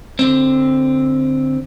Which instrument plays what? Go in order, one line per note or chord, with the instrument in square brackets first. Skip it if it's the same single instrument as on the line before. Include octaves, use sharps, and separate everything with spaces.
[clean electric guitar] D3 C4